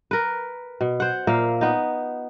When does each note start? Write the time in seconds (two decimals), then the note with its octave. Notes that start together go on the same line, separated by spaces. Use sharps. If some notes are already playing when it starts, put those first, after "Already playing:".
0.11 A#4 B4
0.81 B2
1.00 C5 F#5
1.27 A#2 A#3 E5 F5
1.61 B3 D#4